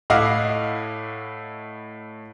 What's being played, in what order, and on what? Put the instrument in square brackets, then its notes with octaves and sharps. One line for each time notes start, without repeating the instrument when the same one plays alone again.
[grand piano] A2 E4 D#5 F5 F#5 D6